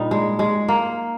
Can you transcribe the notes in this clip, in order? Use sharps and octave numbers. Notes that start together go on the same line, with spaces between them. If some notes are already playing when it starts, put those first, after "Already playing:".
Already playing: A#2 G3 D#4
G#3
G#3
A#3